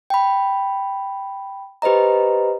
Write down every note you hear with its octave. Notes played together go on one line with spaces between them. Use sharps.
G5 B5
G4 B4 C5 D#5 A#5